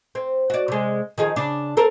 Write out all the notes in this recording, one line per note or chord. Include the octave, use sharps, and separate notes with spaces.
C4
F#4 D5
C3 G#3
D#3 F3 G#4
C#3 D4
C4 A4 A#4